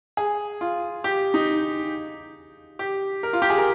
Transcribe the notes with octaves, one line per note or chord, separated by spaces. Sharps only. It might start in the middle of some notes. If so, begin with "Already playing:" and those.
G#4
F4
G4
D#4
G4
A#4
F4
G4
G#4
A#4